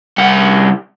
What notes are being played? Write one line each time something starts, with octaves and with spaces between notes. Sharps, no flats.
C2 F#5